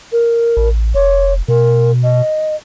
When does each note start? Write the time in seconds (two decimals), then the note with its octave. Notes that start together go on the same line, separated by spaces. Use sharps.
0.12 A#4
0.57 A1
0.95 F1 C#5
1.48 B2 A#4
2.04 D#5